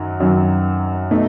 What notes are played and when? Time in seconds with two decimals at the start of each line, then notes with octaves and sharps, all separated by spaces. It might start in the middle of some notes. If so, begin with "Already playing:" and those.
Already playing: F#2 D#3 F#3
0.20 F#2 D#3 F#3
1.11 B2 A3 D#4